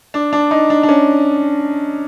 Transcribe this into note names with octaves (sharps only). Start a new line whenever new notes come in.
D4
D4
D#4
D4
D4
C#4